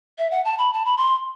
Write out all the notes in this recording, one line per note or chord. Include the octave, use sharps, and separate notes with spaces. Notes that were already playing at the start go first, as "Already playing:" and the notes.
E5
F#5
A5
B5
A5
B5
C6